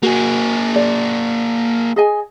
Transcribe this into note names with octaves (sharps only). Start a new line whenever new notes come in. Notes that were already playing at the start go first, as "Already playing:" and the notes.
A#3 F#4 G#4
D5
G#4 D#5 G#5